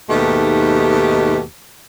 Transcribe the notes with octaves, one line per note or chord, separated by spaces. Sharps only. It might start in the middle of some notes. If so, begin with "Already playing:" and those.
D#2 G#2 B2 A3 D#4 G4